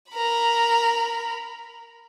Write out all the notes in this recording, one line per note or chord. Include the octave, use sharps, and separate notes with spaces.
A#4 B5